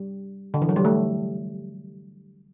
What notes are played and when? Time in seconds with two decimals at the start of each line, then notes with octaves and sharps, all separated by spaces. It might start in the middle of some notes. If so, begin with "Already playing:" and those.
Already playing: G3
0.54 D3
0.62 E3
0.69 F#3
0.76 G3
0.85 A3